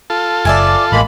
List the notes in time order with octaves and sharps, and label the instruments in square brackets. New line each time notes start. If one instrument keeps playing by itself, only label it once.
[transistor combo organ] F4 A4
[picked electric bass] F#1 [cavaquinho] D5 E5 G#5
[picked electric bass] A1 [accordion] G#3 A#3 B5